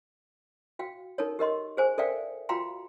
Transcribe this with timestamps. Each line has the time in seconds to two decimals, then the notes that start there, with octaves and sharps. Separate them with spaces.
0.79 F#4 F5 G5
1.18 D#4 A4 A#4 C#5
1.39 G4 A#4 D#5 C6
1.77 G#4 C5 G#5
1.98 A4 A#4 D5 E5 F5 G5
2.49 F4 F#4 F5 G5 A#5 C6